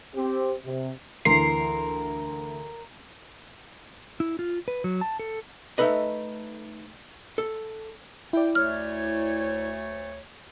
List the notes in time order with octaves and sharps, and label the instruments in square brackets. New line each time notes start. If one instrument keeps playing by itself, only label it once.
[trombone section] C4 G4
C3
[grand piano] D2 E3 C6 [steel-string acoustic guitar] A#4 [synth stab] C7
[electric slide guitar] E4
F4
B4
F#3
A5
A4
[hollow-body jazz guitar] A3 D4 D#4 A4 B4 D#5
A4
[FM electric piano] E4 D5 [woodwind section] G5
[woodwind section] D2 A3 C#5 [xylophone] F6